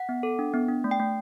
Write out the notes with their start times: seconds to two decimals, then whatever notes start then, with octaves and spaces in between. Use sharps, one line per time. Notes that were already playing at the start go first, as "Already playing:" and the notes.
Already playing: F#5
0.09 B3
0.23 A4
0.39 D4
0.54 B3
0.69 D4
0.84 A3
0.91 G5
0.99 A3